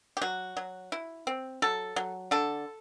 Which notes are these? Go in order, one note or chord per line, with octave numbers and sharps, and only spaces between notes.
G4
F#3 F#4
F#3
E4
C4
F#3 A4
F#3
D3 A4